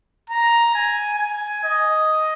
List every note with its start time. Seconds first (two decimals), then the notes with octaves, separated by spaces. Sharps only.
0.30 A#5
0.74 G#5
1.19 G#5
1.64 D#5